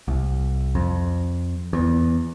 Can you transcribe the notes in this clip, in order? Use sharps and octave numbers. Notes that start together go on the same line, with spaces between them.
C2
F2
E2